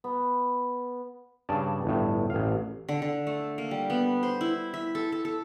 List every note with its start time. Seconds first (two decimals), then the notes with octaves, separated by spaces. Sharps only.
0.04 B3
1.49 G2 C#3 D5 A5
1.85 G1 A2
2.30 A1 F5
2.89 D3
3.02 D3
3.27 A3
3.58 A#3
3.71 G3
3.90 B3
4.23 C5
4.41 E4
4.74 E5
4.95 A4
5.12 A4
5.25 A4